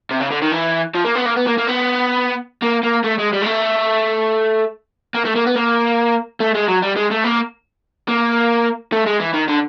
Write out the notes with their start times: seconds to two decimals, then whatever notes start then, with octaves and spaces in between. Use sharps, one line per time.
0.11 C3
0.20 C#3
0.31 D3
0.42 D#3
0.52 E3
0.94 F3
1.05 A#3
1.15 B3
1.25 A#3
1.36 B3
1.46 A#3
1.58 A#3
1.67 B3
2.62 A#3
2.83 A#3
3.04 A3
3.18 G#3
3.33 G3
3.42 G#3
3.46 A3
5.15 A#3
5.25 A3
5.35 A#3
5.46 B3
5.56 A#3
6.40 A3
6.55 G#3
6.68 F#3
6.82 G3
6.96 G#3
7.11 A3
7.24 A#3
8.08 A#3
8.92 A3
9.06 G#3
9.20 E3
9.34 D#3
9.48 D3